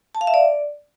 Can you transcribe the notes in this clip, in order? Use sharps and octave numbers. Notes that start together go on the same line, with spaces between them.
A5
F5
E5
D5